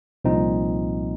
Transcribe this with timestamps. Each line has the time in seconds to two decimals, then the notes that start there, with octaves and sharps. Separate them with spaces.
0.25 C2 A#2 F3 C4 D#4